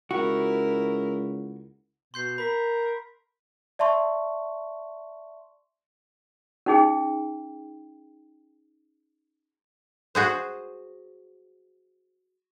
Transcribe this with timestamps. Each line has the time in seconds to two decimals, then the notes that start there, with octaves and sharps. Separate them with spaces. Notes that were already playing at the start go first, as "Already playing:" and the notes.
0.11 C#2 E4 F#4 A#4
2.14 B2 C6 G6 C7
2.38 A#4 B5 B6
3.79 D5 E5 A5 C6 C#6
6.66 C#4 D#4 G#4 G5
10.15 F#4 G#4 C5